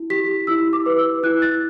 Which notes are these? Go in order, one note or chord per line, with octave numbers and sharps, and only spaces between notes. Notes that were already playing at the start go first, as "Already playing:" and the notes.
Already playing: E4
G4 B6
E4 E6
D6
B4
E6
E4 F#6
A6